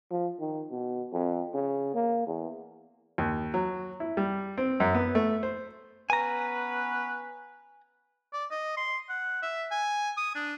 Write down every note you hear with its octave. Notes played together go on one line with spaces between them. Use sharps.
F3
D#3
B2
F2
C#3
A#3
E2
D#2
F#3
E4
G3
C4
F#2
B3
A3
C5
B3 C#4 B4 G#5 A#5
D5
D#5
C6
F#5
E5
G#5
D#6
D4